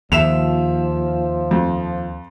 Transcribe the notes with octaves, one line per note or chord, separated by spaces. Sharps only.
D#2 F3 E5 E7 F7
F2